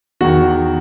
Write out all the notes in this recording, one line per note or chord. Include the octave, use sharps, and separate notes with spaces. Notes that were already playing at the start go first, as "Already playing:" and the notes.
E2 D#3 F#4